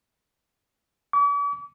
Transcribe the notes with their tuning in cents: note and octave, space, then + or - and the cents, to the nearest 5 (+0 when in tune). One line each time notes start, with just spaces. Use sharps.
D6 -45